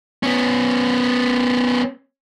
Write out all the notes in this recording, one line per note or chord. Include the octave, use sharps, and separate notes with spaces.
B3 C#4